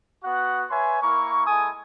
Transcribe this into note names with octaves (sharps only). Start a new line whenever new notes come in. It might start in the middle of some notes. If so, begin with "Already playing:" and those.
B3 F#4 F#5
B4 C#5 E5 G#5 C6
A#3 E4 A#4 C#6
G#3 E4 A4 G#5 D#6